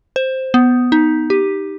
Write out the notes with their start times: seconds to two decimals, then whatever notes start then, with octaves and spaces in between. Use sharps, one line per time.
0.16 C5
0.54 B3
0.92 D#4
1.30 G4